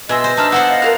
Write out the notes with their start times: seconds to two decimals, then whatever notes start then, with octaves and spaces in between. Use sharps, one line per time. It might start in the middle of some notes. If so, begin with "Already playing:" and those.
0.09 B2 G#4 D#5 E5 C6 E6
0.24 C5
0.37 D4 D#4 E5 A5 F6
0.52 B3 E4 C5 F#5
0.69 D#5 F5
0.82 F4 G#4 A#4